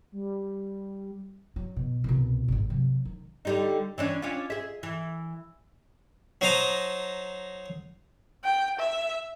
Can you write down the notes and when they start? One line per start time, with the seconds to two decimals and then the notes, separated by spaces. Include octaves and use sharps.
0.12 G3
1.56 F#3
1.76 B2
2.04 C2 B2
2.48 G#1 G#2
2.70 C3 F#3
3.05 D#3
3.45 D3 G3 D#4
3.98 E3 C#4 D4
4.22 C#4 D4 F4
4.50 G#4 E5
4.83 E3
6.41 F#3 D#4 C5 A5 A#5 D#6
8.44 G5
8.79 E5